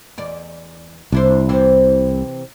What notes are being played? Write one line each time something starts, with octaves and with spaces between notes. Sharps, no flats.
E2 D5
C2 D4 E4 C5
C3 E3 C4